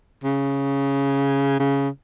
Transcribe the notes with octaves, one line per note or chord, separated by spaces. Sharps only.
C#3
C#3